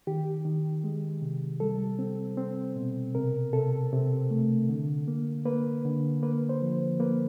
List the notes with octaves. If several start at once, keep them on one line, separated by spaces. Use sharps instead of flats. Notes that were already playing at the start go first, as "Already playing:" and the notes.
D#3 G4
D#3
G#3
C3
G3 A4
C4
C4
B2
C3 A#4
C3 A4
C3
A3
D3
A#3
A#3 B4
D3
A#3 B4
C5
F3
A#3 B4